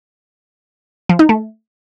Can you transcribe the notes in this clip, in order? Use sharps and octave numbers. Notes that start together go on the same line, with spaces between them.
F3
D#4
A3